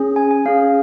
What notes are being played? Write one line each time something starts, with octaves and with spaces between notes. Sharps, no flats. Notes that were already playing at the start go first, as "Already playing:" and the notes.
Already playing: C#4 G#4
G#5
G#5
C#4 G#4 F5